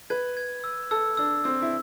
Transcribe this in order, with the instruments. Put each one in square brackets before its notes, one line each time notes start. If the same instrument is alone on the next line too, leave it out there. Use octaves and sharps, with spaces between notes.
[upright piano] B4 [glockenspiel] G#6
[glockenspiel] G#6
E6
[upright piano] A4 [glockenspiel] E6
[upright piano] D4 [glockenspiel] E6
[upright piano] C4 [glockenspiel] E6
[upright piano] E4